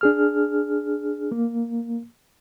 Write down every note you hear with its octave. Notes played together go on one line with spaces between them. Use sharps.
D4 G#4 F6
A#3